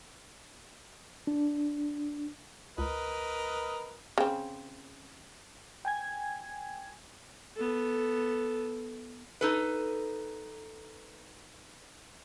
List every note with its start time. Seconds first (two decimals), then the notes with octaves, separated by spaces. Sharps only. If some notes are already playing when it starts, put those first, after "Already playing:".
1.27 D4
2.78 C#2 A#4 B4 D#5
4.18 C#3 C4
5.85 G5 G#5 G#6
7.56 B3 A4
9.41 D#4 A4 B4